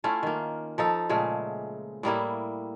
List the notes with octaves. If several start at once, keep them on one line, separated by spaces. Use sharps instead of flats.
A3 C#4 E4 F4
D#3 A#3
F3 D#4 A4
A#2 C#3 G#3 A3
A2 G3 A#3 E4